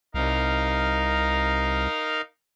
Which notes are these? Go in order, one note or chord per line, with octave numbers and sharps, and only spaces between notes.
C2 D#4 A#4 F5